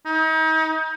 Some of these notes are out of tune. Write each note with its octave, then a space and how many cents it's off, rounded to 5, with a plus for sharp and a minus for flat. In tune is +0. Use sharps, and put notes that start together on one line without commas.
D#4 +35